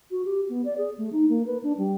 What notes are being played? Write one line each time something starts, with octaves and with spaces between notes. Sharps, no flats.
F#4
G4
B3
D5
G#4
A3
D#4
A#3
B4
D4
G3